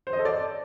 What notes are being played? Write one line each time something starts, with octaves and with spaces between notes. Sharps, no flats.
C5
D#5
A4
D5